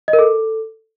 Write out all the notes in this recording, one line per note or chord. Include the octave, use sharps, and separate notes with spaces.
D#5
A#4
A4